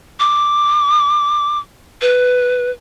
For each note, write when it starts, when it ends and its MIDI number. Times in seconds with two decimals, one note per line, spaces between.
0.20 1.59 86
2.01 2.71 71